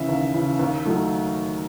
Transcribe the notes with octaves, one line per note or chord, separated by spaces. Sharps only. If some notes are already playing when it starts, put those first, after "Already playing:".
Already playing: C#3 E3 E5
D#2
C#3 E3
D#2
D#3 F#3 A3